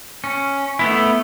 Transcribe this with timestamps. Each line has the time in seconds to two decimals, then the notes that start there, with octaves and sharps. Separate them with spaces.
0.24 C#4
0.79 A3 B3 E4